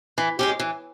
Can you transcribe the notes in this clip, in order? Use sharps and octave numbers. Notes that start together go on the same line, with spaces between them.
E3
G#3 C#4 G4
E3